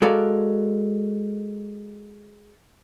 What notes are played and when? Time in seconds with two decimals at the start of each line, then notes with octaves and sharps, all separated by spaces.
0.02 G#3 F#4 A4 A#4 D5 F5